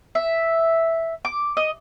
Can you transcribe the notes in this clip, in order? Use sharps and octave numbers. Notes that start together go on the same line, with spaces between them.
E5
D6
D#5